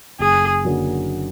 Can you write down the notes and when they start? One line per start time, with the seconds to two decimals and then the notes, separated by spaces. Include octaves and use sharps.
0.19 F#1 G#4
0.65 F#2 D3 F#3 A#3